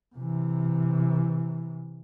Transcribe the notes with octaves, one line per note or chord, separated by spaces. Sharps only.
C3 E3